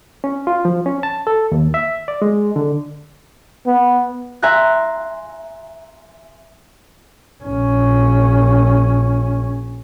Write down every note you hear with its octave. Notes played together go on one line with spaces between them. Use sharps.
C#4
F4
F3
C#4
A5
A4
D#2
E5
D5
G#3
D3
B3
E5 G#5 A#5 C6 F#6
A#1 C#4